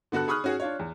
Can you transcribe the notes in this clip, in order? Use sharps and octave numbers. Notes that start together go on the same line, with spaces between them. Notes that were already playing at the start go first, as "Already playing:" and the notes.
D3 B3 F#4 A4 F#6
G#4 B5 C#6 D#6 F6 F#6
C#4 F#4 G#4
D4 F4 C#5
E2